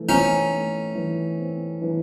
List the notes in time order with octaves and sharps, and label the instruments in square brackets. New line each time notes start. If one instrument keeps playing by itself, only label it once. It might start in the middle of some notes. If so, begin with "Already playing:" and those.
Already playing: [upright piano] E3 A3
[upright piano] C4 [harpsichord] C#4 D#4
[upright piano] A3
E3
C4
E3